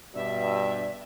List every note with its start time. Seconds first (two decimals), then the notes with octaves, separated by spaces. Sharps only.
0.15 G2 B2 D5 E5